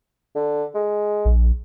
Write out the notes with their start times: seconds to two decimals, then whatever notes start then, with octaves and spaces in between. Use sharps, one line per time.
0.35 D3
0.75 G#3
1.25 A#1